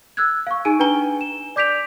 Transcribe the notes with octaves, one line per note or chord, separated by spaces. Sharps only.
E6 F#6 G#6
F5 C#6
D#4 G#4 G#5 D7 D#7
D4 B4 G5 G#5 A#5 G7
E7
D5 D6 G6 B6 D7 F7